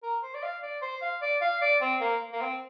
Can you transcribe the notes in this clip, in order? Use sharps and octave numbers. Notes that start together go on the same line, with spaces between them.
A#4
C5
D5
F5
D5
C5
F5
D5
F5
D5
C4
A#3
A#3
C4